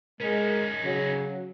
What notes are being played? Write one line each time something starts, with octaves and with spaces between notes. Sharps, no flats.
G#3 C#4 D#4 A#4
C#3 F#3